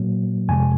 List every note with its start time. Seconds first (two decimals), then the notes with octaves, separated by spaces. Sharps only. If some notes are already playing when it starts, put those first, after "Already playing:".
Already playing: A#2 F#3 A#3
0.48 F2 C3 F3 G#3 G#5